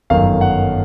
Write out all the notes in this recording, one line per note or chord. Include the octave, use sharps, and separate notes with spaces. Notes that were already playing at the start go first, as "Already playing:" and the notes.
G1 F#2 D#3 F5
F#5